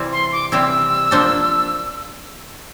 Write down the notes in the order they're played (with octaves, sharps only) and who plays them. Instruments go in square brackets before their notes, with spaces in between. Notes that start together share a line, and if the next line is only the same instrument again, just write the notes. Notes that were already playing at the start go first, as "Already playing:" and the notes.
Already playing: [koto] C3 E3 G3 C4 E4
[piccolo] C6
D6
[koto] C3 E3 G3 C4 E4 [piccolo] E6
[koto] F3 A#3 D4 A4 C5